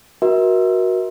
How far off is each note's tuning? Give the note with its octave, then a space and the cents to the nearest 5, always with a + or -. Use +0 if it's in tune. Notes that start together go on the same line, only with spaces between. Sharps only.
F#4 +0 A#4 +30 E5 -35